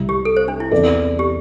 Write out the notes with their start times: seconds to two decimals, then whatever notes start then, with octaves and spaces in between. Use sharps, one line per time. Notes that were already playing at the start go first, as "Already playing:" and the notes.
Already playing: C2 C3 G3
0.09 G4
0.25 A4
0.37 C5
0.48 D4
0.60 E4
0.71 E2 E3 C4 A4 D5
1.19 G4